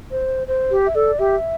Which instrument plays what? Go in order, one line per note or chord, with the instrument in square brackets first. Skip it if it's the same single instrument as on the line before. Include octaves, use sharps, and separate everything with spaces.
[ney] C5
C5
[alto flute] G4
[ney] E5
[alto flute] A4 [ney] D5
[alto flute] G4 [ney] E5